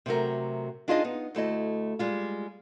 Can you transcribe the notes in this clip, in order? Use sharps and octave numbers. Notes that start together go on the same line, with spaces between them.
C3 F#3 A3 A#4
D4 D#4 F4 G#4 D5 D#5
B3 D#4
D2 A3 E4 D#5
G3 G#3 F4